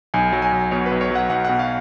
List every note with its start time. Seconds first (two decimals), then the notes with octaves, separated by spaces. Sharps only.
0.14 B1 G#5
0.33 F#3
0.42 G#5
0.52 B1
0.71 B2 C#5
0.86 B4
0.91 B1
1.01 C#5
1.11 F#3 F#5
1.30 B1 F#5
1.45 B2 F#5
1.59 F5